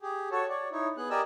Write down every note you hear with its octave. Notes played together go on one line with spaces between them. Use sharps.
G4 G#4
F#4 A4 C#5
C#5 D5
D#4 E4 C#5
B3 G#4 F#6
G4 A#4 D5 D#5 G#5 E6